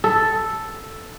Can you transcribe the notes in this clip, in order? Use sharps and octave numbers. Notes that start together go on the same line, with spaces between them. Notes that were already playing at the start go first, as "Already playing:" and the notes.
A4